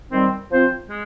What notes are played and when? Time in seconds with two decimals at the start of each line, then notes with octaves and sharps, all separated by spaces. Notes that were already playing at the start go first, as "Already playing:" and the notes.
0.11 D#3 G3 C4
0.51 F3 C4 F4 C5
0.90 G#3